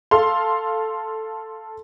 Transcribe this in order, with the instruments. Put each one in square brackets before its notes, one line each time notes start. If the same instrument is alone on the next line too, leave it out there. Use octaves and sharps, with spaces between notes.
[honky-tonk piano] A4 F5 C6